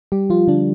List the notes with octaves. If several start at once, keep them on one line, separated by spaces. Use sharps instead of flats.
G3 G4
F3 F4
D3 D4